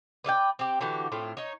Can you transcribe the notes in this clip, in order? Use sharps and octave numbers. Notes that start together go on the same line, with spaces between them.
B4 D5 E5 G5
C4 G4
D3 E3 F#4 G4
A2 C4 F4
D#4 C#5